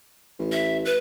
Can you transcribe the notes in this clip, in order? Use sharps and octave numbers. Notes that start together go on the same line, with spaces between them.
A1
E5
B4